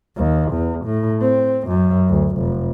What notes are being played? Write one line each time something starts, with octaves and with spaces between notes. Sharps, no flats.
D#2
E2
A2
C4
F#2
D2
F1